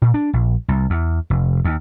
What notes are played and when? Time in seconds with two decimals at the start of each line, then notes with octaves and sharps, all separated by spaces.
0.02 A#2
0.14 D4
0.33 A#1
0.68 C2
0.90 E2
1.30 F1
1.65 D#2